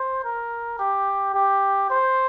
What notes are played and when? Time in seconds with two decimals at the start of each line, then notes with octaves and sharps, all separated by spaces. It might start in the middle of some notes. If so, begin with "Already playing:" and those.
Already playing: C5
0.24 A#4
0.79 G4
1.34 G4
1.90 C5